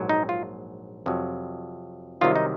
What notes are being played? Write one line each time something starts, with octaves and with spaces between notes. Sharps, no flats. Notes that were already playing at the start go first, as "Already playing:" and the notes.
Already playing: A#1 G#2 F#3
D#4
F4
F2 C3 F#3
C2 C3 D#3 F#3 F4
D#4